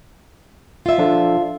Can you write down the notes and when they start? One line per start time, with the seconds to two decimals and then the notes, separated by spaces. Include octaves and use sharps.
0.86 F4 E5
0.98 F3 D4 A4